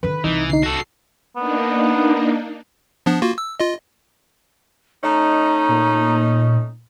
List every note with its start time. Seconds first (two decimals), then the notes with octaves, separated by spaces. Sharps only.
0.03 D3 D#3 B4
0.24 C2 E3 D#4
0.50 D3 D#4 C7
0.63 F#4 A4 A#6
1.36 A#3 B3 D4 D#4
3.06 F3 B3 D4
3.22 A#3 F4 F#4
3.38 E6
3.60 F4 D#5
5.04 A3 C#4 D#4 A#5
5.69 A#2